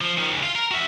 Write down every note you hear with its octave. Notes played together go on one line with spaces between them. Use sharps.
F3
D#3 F3
D#2 C#3
F4
A#4
F#4 E5